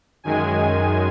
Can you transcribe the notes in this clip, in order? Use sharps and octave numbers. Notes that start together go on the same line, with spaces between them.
F#2 D#3 G#3 G#5
G#5